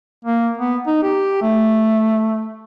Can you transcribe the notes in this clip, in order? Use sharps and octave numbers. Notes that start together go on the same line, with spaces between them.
A#3
B3
D#4
G4
A3